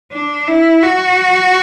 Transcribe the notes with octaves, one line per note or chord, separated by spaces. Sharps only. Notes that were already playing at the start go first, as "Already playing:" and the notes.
D4
E4
F#4